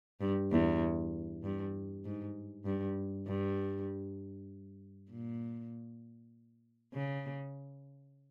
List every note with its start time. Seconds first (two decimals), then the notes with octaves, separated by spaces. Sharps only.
0.21 G2
0.51 E2
1.43 G2
2.05 G#2
2.65 G2
3.27 G2
5.11 A#2
6.94 C#3